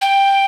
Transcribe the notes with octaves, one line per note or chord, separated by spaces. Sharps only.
G5